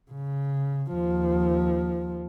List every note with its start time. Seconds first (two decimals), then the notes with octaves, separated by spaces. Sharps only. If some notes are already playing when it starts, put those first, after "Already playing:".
0.11 C#3
0.92 D#2 F3